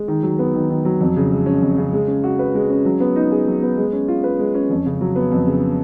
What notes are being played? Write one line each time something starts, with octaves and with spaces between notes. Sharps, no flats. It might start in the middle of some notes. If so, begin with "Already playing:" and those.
Already playing: G#3
D#3
F#3
B3
D#3
D#3
F#3
F2
C#3
G#3
C#4
F2
C#3
G#3
C#4
F#4
B4
G#3
C#4
F#3
B3
D#4
G#4
F#3
B3
G#3
C#4
F4
B4
G#3
C#4
F2
C#3
F#3
B3
F2
C#3